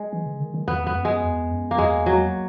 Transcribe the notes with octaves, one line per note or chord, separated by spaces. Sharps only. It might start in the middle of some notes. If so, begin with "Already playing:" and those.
Already playing: G#3
E3
C#3
D#3
D#3
E2 B3
B3
F#2
G#3
E2
F#2
A#3
E2 G#3
F#3